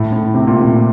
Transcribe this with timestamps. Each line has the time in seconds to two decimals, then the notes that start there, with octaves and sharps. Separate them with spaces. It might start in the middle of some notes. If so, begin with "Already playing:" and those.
Already playing: A2
0.13 A2
0.34 C3
0.47 A#2
0.61 C3